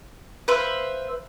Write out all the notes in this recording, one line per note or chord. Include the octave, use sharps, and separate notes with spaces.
B4 C5 E5 F5